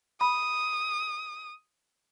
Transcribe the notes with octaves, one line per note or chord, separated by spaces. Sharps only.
B5 D#6